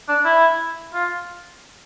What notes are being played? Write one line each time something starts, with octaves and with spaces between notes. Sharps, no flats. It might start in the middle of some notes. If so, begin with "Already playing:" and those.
D4
E4
F4